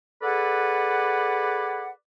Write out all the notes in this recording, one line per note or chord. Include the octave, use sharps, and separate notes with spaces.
G#4 A4 B4 D5 F#5